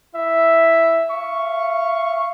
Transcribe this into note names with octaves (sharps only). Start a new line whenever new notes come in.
E4 E5
E5 F5 C#6